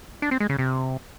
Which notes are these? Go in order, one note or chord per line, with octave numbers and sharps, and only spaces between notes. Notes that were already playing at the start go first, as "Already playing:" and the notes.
D4
C4
G#3
C#3
C3